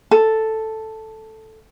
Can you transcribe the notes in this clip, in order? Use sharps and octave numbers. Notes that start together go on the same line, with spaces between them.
A4